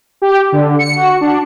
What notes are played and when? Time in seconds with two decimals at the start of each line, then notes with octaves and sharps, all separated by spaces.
0.22 G4
0.52 D3
0.79 C#7
0.96 F#4
1.21 D4